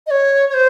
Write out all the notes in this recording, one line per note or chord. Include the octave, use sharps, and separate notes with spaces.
D#5
C#5
C#5
C5